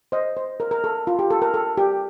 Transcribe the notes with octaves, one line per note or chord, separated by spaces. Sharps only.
C5 D#5
C5
A#4
A#4
A4
F4
G4
A4
A#4
A4
G4